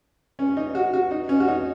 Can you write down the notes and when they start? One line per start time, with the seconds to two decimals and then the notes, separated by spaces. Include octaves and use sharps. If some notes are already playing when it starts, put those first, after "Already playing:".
0.39 C#4
0.57 D#4
0.75 F#4
0.93 F#4
1.11 D#4
1.29 C#4
1.40 F#4
1.47 D#4